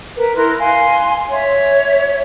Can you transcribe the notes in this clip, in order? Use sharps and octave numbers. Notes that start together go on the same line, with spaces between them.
A#4 B4
E4 A#4 C6 F#6
F5 G#5 C6
C#5 E5